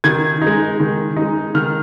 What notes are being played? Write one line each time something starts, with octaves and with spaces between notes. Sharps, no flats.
D#3 G#6
D#4
G#3
D#3
G#3 D#4
D#3 F6